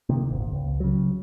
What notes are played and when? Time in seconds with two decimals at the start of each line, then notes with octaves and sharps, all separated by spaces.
0.09 C3 D#3 A#3
0.29 D#1 G#1
0.52 C#2
0.80 C#3 F#3